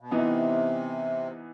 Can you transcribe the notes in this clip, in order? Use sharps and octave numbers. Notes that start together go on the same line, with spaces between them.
B2
C3 E3 B3 D#4